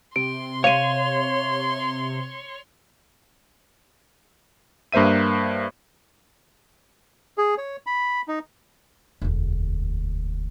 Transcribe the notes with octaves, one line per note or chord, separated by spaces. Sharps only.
C3 C6 D7
C#5 F5 D#7
G2 A#3 C5 E5 D#7
G#4
C#5
B5
D#4
E1 D2